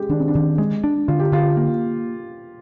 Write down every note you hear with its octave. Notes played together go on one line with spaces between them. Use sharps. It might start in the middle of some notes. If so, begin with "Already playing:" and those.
Already playing: G#3 G4
D#3 D4
C4
D4
D#3
G#3
D4
D3 F4
G4
D3 F4
A#3